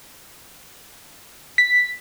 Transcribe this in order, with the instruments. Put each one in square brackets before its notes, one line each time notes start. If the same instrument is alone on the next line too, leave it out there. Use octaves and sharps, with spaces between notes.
[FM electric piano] B6